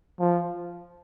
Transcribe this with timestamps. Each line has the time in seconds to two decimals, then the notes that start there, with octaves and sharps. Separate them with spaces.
0.19 F3